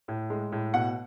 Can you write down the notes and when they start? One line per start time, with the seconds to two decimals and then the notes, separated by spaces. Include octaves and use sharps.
0.08 A2
0.30 G#3
0.52 A2
0.74 B2 F#5